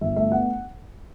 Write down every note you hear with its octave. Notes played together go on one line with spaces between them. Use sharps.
G1 E5
A3 E5
B3 F#5